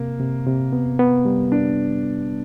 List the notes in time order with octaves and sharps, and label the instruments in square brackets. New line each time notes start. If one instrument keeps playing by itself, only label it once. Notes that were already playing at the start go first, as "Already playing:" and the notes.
Already playing: [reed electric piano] C3 [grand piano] A#3
[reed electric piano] C3
C3
B3
B3
G3
[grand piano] D4